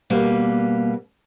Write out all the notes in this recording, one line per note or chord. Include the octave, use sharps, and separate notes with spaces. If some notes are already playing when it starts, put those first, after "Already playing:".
B2 G3 A#3